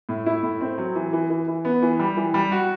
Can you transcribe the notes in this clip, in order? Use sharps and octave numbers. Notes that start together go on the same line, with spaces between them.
A2
E4
A2
C4
F#3
E3
E3
E3
E3
B3
E3
G3
E3
G3
F#4